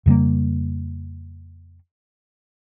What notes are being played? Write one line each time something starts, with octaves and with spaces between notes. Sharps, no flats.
F2 C#3 G3 A#3